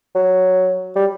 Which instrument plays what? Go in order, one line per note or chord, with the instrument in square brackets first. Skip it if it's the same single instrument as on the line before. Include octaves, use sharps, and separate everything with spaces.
[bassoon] F#3
G3